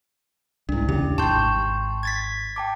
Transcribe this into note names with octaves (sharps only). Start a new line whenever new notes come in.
C2 G#2 D4 E4
D#2 C#3 C#4 G4
G#1 F#2 G5 A5 C6 C#6 G6
G#6 A6 B6
G5 A5 D6